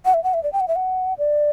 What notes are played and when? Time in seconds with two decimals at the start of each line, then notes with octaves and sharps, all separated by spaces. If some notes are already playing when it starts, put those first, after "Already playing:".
0.05 F#5
0.14 E5
0.24 F#5
0.34 E5
0.43 D5
0.53 G5
0.60 F#5
0.68 E5
0.76 F#5
1.18 D5